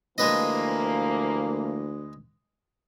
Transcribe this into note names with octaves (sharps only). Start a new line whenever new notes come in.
D2 E3 F3 G#3 A#3 B4 D#5